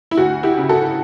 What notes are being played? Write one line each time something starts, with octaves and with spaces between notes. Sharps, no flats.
E4
D2 F#4
E4 G4
C#3
F#4 A4